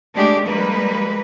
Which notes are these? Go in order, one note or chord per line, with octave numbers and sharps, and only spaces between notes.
G#3 A3 D4 G4
F3 G3 G#3 A#3 B4